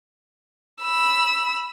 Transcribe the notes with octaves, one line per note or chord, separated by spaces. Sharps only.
B5 E6